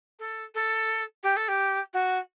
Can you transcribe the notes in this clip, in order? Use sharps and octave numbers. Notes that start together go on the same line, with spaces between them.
A4
A4
G4
A4
G4
F#4